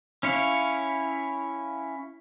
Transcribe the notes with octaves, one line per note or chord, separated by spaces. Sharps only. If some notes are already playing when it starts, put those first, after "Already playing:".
C#4 E4 C#5 F5